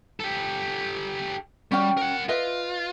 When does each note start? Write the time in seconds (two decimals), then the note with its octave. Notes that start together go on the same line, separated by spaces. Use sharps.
0.20 G4 A4
1.72 G3 C#4 F#4 G5
1.97 A#4 F#5
2.29 F4 B4 D#5 E5